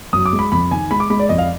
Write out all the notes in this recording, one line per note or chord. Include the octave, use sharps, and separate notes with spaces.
F#2 D#6
D6
G#3
B5
F2 B5
D#3 G#5
G#3 B5
D6
G#3 B5
D5
F2 D#5
F5